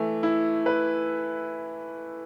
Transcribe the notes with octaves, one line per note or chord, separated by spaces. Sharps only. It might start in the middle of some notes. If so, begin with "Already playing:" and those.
Already playing: E3 A3
E4
B4